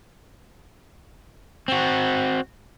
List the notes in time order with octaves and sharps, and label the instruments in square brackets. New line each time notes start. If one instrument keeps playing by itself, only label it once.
[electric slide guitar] C4 F#4